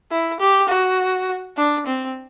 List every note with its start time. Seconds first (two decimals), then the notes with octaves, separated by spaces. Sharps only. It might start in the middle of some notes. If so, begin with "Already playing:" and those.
0.11 E4
0.40 G4
0.70 F#4
1.57 D4
1.87 C4